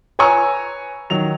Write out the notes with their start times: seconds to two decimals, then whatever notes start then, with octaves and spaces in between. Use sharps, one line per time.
0.19 B4 C#5 G#5 A#5 C#6 E6
1.10 D#3 F#3 F7